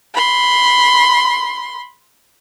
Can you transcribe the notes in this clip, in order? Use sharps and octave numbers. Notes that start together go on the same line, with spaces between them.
B5 C6